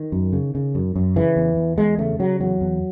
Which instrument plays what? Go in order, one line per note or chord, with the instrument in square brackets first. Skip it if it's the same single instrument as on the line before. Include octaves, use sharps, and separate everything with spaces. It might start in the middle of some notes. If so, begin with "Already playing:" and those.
Already playing: [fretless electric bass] D#3
F#2
C#3
C#3
F#2
F#2
C#3 E3
E2
E2
E2 G#3
C#3 A3
C#3 F#3
E2 F#3
E2